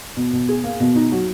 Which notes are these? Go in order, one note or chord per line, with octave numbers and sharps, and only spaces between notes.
B2
B2
G#4
A#3
B2
D#4
F#3